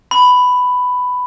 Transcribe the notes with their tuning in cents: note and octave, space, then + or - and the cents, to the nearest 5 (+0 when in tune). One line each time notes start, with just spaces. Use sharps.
B5 +10